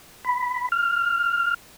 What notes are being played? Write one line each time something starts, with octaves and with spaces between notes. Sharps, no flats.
B5
F6